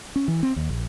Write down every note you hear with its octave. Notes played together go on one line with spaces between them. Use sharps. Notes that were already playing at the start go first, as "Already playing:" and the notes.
C#4
E3
C4
D#2
A#1